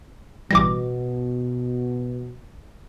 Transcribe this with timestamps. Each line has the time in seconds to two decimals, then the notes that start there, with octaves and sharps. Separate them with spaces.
0.51 A1 B2 E3 G3 D6 A#6